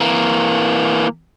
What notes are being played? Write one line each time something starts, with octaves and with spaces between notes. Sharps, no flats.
E3 A#3